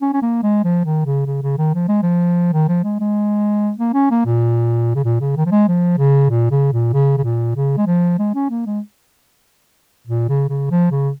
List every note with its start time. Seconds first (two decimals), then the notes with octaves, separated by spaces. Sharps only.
0.01 C#4
0.13 C#4
0.22 A#3
0.43 G#3
0.64 F3
0.85 D#3
1.06 C#3
1.27 C#3
1.43 C#3
1.58 D#3
1.74 F3
1.88 G#3
2.03 F3
2.53 D#3
2.68 F3
2.84 G#3
3.00 G#3
3.78 A#3
3.94 C#4
4.11 A#3
4.25 A#2
4.95 C#3
5.04 A#2
5.20 C#3
5.36 D#3
5.46 F3
5.51 G#3
5.68 F3
5.98 C#3
6.30 A#2
6.51 C#3
6.73 A#2
6.93 C#3
7.17 C#3
7.24 A#2
7.56 C#3
7.77 G#3
7.87 F3
8.19 G#3
8.35 C#4
8.50 A#3
8.66 G#3
10.07 A#2
10.29 C#3
10.49 C#3
10.71 F3
10.91 C#3